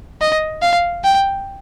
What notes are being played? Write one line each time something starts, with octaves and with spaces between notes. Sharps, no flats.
D#5
F5
G5